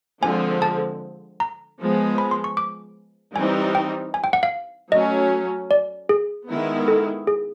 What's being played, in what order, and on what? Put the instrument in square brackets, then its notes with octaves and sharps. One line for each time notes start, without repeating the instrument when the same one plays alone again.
[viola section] D3 F3 G#3 C4 [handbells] G#5
[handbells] A5
A#5
[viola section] F3 G#3 B3
[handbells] B5
C6
C#6
D6
[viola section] E3 G3 C4 D#4 [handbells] G#5
[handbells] G5
G#5
G5
F#5
F5
[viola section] F#3 A3 C#4 [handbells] D#5
[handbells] D5
G#4
[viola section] D#3 G#3 B3 E4
[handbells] A4
G#4